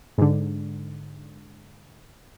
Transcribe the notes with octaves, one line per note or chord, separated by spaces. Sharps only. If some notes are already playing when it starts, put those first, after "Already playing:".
G#2 D3